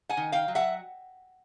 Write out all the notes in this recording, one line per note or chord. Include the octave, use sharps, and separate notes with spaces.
F#5 G#5
D#3
F5 G5
F#3
E5 F#5